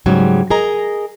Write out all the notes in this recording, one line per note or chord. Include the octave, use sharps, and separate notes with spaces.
G#2 C#3 F#3 G3
G#4 A#4 D#5 A#5